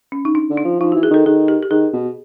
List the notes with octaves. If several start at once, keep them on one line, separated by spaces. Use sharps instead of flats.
C#4
D#4
D4
D3
D4
F3
F3 D#4
F#4
E3
G#4
D#3 A4
D#3 G#4
G4
G4
D#3 G#4
B2